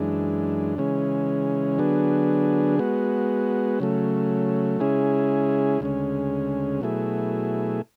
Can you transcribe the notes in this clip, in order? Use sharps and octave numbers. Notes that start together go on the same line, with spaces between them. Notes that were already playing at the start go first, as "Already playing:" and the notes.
Already playing: F#2 E3 G#3 D4
C#3 E3 G#3 C#4
D3 F#3 B3 D4 G#4
G#3 B3 F#4
C#3 F#3 A3
C#3 G#3 C#4 E4 G#4
D2 C#3 G#3 C#4
B2 F#3 A3 E4 G#4